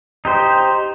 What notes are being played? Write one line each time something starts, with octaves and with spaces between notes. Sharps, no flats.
D#4 G4 C5